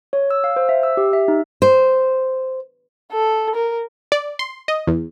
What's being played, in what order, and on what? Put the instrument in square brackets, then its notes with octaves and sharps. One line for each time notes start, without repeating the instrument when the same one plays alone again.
[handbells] C#5
E6
F5
C5
E5
E6
G4
E5
D#4
[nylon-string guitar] C5
[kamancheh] A4
A#4
[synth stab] D5
C6
D#5
E2